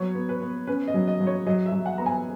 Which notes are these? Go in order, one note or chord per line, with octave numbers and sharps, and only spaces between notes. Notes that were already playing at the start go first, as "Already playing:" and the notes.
Already playing: F#3 B3 C#5
B3
B4
B3
C#4 B4
D#5
F#3
D#5
F#3
C#5
F#3 D#5
E5
F#3
F#5
B3 A#5
G#5